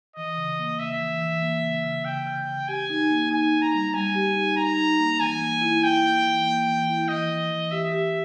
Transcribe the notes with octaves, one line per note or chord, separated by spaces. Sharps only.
E3 D#5
C#3
A#3
C#3 E5
E3
E3
A#3
C#3
C#3
C#3 G5
C#3
C#3
G4 G#5
D#4
A#3
D#4 G#5
D#4
A#5
G3
G3 G#5
G4
D#4
D#4 A#5
D#4
A#3
E3 G#5
A#3
E4
E4 G5
A#3
E3
A#3
E3
E4
E3 D#5
E3
E3
G4 E5
G4